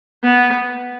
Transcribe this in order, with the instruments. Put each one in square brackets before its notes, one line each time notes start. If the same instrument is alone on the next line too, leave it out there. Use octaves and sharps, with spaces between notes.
[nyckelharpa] B3